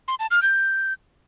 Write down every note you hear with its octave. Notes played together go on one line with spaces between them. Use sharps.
C6
A5
F6
G6